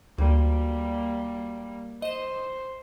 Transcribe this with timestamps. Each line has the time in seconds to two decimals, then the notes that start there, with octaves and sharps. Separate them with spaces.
0.18 D2 G3 A#3
2.02 C5 D#5 E7